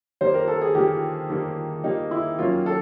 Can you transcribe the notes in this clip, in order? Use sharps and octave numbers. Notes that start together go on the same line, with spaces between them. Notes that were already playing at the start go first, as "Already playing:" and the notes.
D#3 G3 A#3 C5
A#4
A4
G#4
D#3 G3 A#3 G4
D#3 G3 A#3
D#3 G3 A#3 D#4
E4
D#3 F#3 A#3 C#4 F4
A4